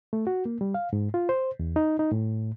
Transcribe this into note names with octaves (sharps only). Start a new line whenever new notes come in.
A3
F#4
A#3
G3
F5
G#2
F4
C5
E2
D#4
D#4
A2